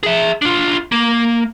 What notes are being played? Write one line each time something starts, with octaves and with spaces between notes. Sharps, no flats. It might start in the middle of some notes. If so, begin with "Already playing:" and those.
G#4 E5
D4 F4
A#3